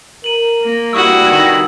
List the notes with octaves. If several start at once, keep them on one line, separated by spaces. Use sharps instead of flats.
A#4 D#7 F#7
A#3
C2 G2 G3 E4 F#4 C#6 D#6 E6
D#3 E6 G#6 F#7